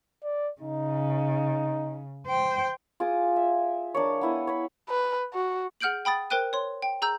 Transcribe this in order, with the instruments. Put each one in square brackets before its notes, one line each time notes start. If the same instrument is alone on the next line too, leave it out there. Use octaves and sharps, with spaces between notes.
[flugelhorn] D5
[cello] C#3 [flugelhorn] D#4
[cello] C5 G5
[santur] F4 G#4 D6 D#6
E5
F3 D4 A#4 C#5
B3 E4 D#6
C#5 B5
[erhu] B4
F#4
[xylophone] G#4 F#5 F6 G6 D7 F#7
G5 B5 D#6 A6
A#4 C5 G5 F#6 D#7
C#5 C6
G5
G#4 A#5 E6 G6